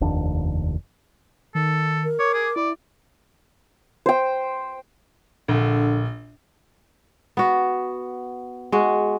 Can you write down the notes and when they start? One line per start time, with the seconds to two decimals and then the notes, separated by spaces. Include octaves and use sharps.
0.01 F1 D#2 D4
1.55 D#3 A4
2.04 A#4
2.19 C#5 D6
2.34 G#4
2.56 E4 D5
4.06 C5 G5
5.48 A#1 D3
7.37 B3 F#4
8.72 G#3 F#4